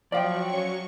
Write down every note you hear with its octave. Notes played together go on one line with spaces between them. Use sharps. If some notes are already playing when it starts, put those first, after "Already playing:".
F3 F#3 D5 F5 G5 C#6
C#4